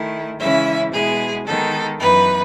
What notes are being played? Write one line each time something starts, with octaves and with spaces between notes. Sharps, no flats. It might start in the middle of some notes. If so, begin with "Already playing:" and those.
Already playing: D#3 A3 E4
C#3 E3 G#3 C#4 E4 E5
B2 G#3 B3 E4 G#4
D#3 G#3 B3 D#4 A4
F#2 E3 B3 D#4 B4